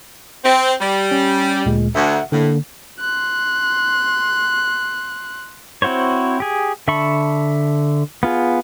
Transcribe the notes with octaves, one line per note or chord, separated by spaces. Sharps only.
C4
G3
C#4
D2 A#2 G#3
D2 E5 F#5
A2 D3 A#3
C6 F#6
C4 E4 F#4 C5 C#5
G4 G#4
D3 E5 A5 B5 C#6
B3 F4 G#4